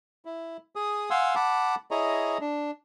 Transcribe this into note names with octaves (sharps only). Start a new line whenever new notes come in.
E4
G#4 D#6
F5 F#5 G#5 C6 E6
F#5 A5 B5 D6
E4 G#4 C#5 D#5 A#5
D4